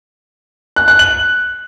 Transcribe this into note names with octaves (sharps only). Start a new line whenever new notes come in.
F#6
F#6
F#7